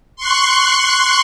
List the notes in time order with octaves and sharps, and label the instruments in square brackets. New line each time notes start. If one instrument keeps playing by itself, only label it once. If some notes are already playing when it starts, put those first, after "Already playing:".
[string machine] C6 C#6 F#6